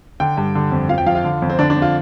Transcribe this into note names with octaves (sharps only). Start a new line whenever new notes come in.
D3 G5
G2
D3
F2
F3 F5
G5
F3 F5
F4
D3
F2
C4
D3 D4
D4
F2
F4